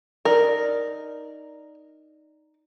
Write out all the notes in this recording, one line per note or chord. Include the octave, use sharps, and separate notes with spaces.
D#4 A#4 D5